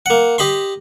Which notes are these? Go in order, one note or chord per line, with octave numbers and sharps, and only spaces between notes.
A#3 F#5
G4 D#5 B5 C6